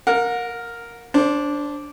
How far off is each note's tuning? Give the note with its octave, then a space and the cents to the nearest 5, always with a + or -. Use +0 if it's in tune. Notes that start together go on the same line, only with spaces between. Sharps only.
A#4 +0 F#5 -40
D4 -10 C5 +20